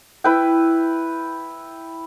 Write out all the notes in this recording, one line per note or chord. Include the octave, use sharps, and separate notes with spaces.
E4 B4 G5